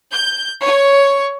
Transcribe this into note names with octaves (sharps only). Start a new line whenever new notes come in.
G6
C#5